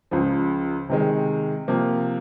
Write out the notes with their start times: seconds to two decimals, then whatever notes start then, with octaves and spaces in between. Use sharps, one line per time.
0.11 C#2 C#3 F3
0.89 C3 D#3 G#3
1.68 C3 F3 A#3